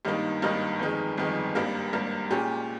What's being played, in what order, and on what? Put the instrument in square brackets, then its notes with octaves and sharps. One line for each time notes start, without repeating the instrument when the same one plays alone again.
[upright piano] G#1 G2 D#3 A#3 D#4
G#1 G2 D#3 A#3 D#4
G1 F2 D#3 G#3
G1 F2 D#3 G#3
G#1 G2 G3 A#3
G#1 G2 G3 A#3
A#2 G#3 C#4 G4